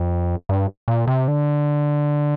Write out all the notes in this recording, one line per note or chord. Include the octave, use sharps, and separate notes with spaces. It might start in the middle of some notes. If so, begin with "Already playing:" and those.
Already playing: F2
G2
A#2
C3
D3